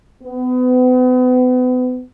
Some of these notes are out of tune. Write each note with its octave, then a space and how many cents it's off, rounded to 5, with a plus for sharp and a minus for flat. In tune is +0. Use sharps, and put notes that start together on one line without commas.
B3 +35